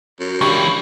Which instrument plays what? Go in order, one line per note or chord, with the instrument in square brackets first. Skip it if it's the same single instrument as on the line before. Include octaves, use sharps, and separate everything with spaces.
[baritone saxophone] F#2
[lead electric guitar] C#2 E3 [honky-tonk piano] D4 G4 [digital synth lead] C#6